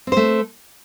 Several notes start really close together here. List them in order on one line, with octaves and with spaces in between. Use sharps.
C4 C5 A3